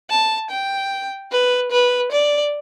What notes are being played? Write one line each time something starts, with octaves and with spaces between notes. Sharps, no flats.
A5
G5
B4
B4
D5